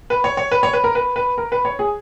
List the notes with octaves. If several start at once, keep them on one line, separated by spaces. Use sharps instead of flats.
B4
C#5
C#5
B4
C#5
B4
A#4
B4
B4
A#4
B4
C#5
G#4